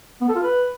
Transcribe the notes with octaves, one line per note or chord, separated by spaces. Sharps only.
B3
A4
F4
B4